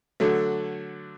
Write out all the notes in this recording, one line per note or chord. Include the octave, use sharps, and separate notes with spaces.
D3 F#3 A3